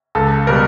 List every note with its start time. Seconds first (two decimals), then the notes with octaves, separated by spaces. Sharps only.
0.15 C#2 A4
0.47 B2 G3 A#4